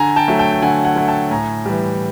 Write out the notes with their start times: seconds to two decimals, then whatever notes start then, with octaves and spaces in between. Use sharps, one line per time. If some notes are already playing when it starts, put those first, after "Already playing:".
Already playing: D3 G#5 A#5
0.16 G5 A5
0.28 F#3 A3
0.39 G5 A5
0.52 G5
0.62 D3 F#5 G#5
0.85 F#5 G#5
0.96 F#3 A3
1.08 G5 A5
1.31 A2 G#5 A#5
1.65 E3 G3